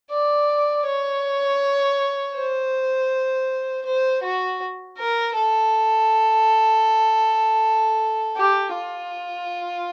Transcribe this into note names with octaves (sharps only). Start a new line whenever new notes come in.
D5
C#5
C5
C5
F#4
A#4
A4
G4
F4